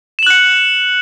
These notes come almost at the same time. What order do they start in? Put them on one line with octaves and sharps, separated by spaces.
E7 F#7 F#6 C#7